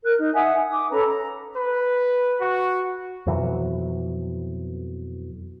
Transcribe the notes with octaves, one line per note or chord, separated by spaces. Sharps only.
A#4 F#6
D#4
E5 F#5 G#5 D#6
D6 D#6
C#4 A4 B4 A#5
A#5
B4
F#4
F2 B2 E3 F#3